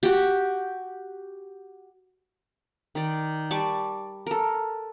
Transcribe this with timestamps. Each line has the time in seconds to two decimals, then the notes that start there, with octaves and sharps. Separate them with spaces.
0.03 F#4 G4
2.95 D#3 D5
3.51 G3 D5 A5 C#6
4.27 A4 A#4